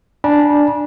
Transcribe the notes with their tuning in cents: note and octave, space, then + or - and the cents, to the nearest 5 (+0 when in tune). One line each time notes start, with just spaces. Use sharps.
D4 +0 G#5 +0 B5 -45